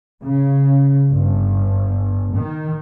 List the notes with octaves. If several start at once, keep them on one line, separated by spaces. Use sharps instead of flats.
C#3
G1
D#3